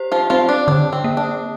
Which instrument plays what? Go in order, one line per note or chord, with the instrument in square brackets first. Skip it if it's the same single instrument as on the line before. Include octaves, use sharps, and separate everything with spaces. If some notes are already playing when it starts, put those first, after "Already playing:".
Already playing: [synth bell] G4 C5
[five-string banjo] F3 F4
[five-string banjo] F3 F4 [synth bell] C4
[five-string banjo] D4
[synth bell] D3 [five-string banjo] D4
[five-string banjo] C4
[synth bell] A#3
[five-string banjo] D4